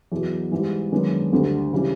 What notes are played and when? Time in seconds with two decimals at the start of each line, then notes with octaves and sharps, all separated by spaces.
0.12 E2 B2 F#3
0.51 G#2 E3 G3
0.92 F#2 D#3 G#3 B3 D4
1.32 D2 D3 G3
1.73 C#3 E3 G3